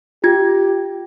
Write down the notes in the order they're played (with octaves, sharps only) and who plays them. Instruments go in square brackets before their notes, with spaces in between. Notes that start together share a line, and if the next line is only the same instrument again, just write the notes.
[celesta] F4 G#6 [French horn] G4